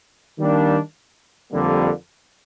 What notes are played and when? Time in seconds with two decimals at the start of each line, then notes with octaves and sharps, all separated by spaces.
0.39 D#3 G3 A#3 D4
1.51 F2 D3 G3 A#3